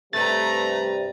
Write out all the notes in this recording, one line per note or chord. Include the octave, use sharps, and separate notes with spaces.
G2 C3 G3 A3 B4 A#5 A6